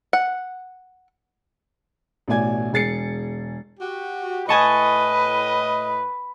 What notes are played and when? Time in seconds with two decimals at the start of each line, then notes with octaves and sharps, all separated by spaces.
0.13 F#5
2.28 A1 B2 A3 D5 G#5 G#6
2.73 E1 G#4 A6 C7 C#7
3.80 F#4 G4
4.49 A2 B4 D#5 G#5 A5 C#6